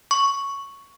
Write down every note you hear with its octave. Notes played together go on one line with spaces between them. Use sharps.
C#6